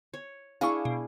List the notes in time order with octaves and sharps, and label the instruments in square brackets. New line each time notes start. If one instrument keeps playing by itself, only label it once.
[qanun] C#5
[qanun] D4 E4 G#4 [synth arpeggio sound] F5 C#6
[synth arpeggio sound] B2